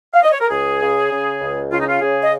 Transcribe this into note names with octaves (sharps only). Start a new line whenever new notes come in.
F5
D#5
C#5
A#4
C#2 G#4
C#3
C#3
C#2
C#3 F4
D#4
F4
C#3 G#4
D#5